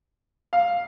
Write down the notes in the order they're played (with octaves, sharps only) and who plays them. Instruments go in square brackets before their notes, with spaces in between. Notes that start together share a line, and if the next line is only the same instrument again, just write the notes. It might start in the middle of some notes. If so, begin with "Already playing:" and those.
[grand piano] F5